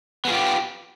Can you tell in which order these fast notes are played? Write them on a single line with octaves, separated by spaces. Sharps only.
B3 G#4 F4 G4